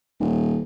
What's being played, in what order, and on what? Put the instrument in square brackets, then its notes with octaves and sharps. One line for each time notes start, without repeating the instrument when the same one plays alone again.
[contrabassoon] D#1